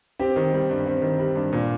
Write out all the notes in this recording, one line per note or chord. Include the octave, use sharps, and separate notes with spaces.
C4 G4
D#3
G3
G2
C4
D#3
G3
G2
A#2